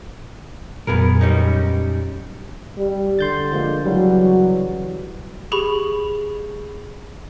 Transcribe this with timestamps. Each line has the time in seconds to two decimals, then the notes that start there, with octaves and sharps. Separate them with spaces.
0.87 F2 A#2 F#3 B3 G#4 A#4
1.21 G3 C#4 D#4
2.77 G3
3.19 D3 C6 G6 A6
3.52 F3 G#3 A#3
3.85 C#3 E3 F#3 G3
5.52 G4 G#4 B5 C#6